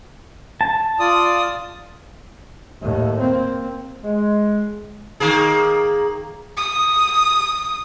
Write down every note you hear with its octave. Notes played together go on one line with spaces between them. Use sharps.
A5
F4 D5 D#6
D#2 A2
A#3 C4
G#3
D#3 A#3 G#4
D#6